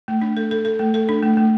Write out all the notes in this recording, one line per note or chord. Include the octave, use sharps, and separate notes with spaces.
A3
D4
A4
A4
A4
A3
A4
D4
A3
A3